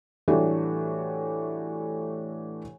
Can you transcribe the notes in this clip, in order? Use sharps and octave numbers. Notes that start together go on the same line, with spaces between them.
A2 E3 G3 A3 D4 F#4